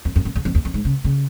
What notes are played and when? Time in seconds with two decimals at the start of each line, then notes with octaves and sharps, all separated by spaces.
0.05 F2
0.16 F2
0.25 F#2
0.35 E2
0.45 F2
0.55 E2
0.65 F2
0.74 G#2
0.85 C#3
1.05 C#3